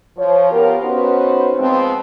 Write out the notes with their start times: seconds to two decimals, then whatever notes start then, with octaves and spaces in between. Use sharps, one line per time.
0.17 F3 C#5
0.51 B3 F4 G4 A#4
0.83 B3 C#4 D#4 F#4 B4 C5
1.57 F3 G#3 B3 C4